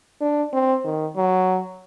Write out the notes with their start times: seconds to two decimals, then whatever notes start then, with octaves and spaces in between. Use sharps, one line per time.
0.21 D4
0.53 C4
0.84 D#3
1.16 F#3